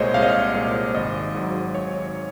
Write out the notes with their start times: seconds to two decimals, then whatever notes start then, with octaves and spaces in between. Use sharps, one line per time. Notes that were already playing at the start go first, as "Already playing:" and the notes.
Already playing: C2 A#2 G#3 C5 C#5 D#5
0.14 C2 F5
0.22 D#5
0.30 F5
0.54 A#2 G#3
0.94 G#1 D#5
1.34 G#2 F#3
1.74 G#1 C#5